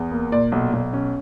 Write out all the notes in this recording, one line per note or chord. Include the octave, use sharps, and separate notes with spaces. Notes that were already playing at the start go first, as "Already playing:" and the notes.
Already playing: E2
A#3
A#2 D5
B1
B1
C#4